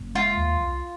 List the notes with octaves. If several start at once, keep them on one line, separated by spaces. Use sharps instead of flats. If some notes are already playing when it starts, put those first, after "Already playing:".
Already playing: F#1
G#3 F4
D#2
C2